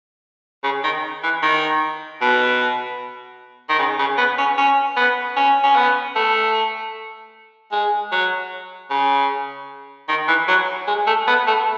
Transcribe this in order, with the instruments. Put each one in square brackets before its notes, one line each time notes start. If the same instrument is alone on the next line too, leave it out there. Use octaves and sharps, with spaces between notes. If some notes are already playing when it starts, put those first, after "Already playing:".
[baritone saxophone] C#3
D#3
E3
D#3
B2
D#3
C#3
C#3
B3
C#4
C#4
B3
C#4
C#4
B3
A3
G#3
F#3
C#3
D#3
E3
F#3
G#3
A3
B3
A3